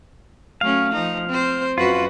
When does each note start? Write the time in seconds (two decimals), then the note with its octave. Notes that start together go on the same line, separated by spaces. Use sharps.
0.61 F#3 A3 C#4 F5
0.92 F3 D#4
1.29 C4 C5
1.78 F#2 F4 F#4 B4